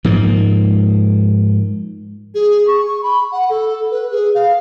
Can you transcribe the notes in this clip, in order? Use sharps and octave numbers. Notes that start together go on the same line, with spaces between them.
G#2 F3 A#3
G#4
C#6
B5
F#5
A4
B4
G#4
F5